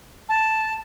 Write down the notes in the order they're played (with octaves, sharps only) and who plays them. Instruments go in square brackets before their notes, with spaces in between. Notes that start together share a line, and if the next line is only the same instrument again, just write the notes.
[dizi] A5